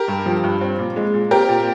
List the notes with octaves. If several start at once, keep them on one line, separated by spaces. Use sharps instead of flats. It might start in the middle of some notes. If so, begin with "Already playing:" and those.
Already playing: G4 A#4
G2
F3
G2
C4
A#2
G#3
A#2
C4 G4 A#4
A#2